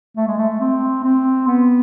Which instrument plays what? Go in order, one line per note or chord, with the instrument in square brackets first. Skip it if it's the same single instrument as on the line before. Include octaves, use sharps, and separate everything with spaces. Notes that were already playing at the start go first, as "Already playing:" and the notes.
[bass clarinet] A3
G#3
A3
C4
C4
B3